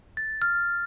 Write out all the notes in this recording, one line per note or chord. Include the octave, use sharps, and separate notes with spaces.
A6
F6